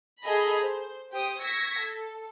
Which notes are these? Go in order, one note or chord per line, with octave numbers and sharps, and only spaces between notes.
G#4 A4 D#5 A#5 B5
C5
G4 C5 G5 D#6
C#6 E6 G#6 A#6 B6
A4